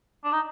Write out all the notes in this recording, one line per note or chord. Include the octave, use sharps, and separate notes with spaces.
D4
D#4